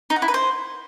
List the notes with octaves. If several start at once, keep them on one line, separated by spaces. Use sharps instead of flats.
D#4
F#5
E4
B4
C5